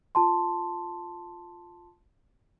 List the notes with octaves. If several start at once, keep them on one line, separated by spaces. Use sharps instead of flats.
F4 A5 C6